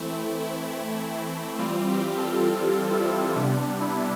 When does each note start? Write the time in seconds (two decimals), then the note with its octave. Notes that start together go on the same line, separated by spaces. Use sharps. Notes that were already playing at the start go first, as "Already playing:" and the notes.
Already playing: E3 A3 C4 E4
0.11 E4
0.40 E4
1.15 E4
1.59 E3 G3 C4 F4
1.88 G4
2.18 A4
2.47 G4
2.91 E4
3.36 C3 G3 B3 D4
3.80 E4